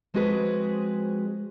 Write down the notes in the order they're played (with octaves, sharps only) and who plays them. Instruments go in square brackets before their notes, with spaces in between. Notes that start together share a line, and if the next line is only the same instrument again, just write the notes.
[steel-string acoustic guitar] F3 G#3 C4 F#4 G#4 B4